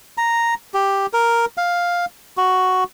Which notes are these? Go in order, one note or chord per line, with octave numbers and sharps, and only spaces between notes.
A#5
G4
A#4
F5
F#4